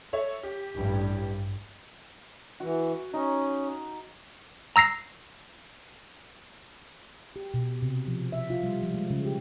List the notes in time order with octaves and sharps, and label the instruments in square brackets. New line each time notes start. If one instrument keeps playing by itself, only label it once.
[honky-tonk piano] A4 C#5 E5
G4
[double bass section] A1 G2
[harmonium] E3 [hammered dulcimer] F#4
[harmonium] C#4 [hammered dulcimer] D#4
[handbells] A#5 E6 A#6 C7
[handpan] G4
B2
C3
F3
E5
F4
G3
F3
G#3
C#3
G4